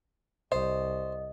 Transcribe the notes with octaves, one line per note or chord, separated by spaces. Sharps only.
C2 C5 D#5